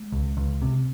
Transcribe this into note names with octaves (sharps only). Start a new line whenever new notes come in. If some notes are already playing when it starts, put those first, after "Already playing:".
Already playing: G#3
C#2
C#2
C3